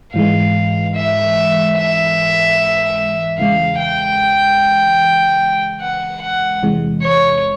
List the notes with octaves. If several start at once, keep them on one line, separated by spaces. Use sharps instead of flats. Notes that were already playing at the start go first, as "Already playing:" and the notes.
G#2 E3 G#3 F5
E5
E5
E2 C#3 E3 G#3 F5
G5
F#5
F#5
E2 C3 E3 G#3
C#5